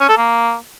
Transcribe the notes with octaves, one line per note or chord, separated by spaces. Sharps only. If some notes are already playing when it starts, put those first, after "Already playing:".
C#4
A4
A#3